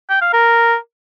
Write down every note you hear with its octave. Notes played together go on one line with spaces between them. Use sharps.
G5
F5
A#4